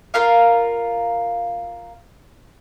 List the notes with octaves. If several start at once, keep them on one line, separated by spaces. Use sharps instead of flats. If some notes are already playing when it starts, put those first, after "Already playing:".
F4 A#4 F5